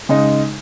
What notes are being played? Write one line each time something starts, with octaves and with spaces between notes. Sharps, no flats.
C#3 G#3 D#4